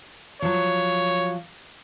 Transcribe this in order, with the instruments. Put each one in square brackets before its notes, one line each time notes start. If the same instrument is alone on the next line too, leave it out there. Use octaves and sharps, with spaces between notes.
[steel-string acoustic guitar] F3 F#3 [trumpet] C#5